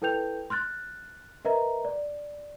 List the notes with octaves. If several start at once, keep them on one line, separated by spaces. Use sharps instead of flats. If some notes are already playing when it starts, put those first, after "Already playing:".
E4 A4 B4 G5 G6 F7
C6 F6 F#6 A6
A#4 B4 D#5 E5 A#5
D5